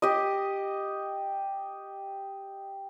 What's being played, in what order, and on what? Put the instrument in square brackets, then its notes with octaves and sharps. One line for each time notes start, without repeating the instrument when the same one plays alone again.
[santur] G4 D#5